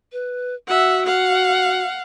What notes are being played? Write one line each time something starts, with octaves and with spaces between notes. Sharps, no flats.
B4
F#4 E5 F#5
F5 F#5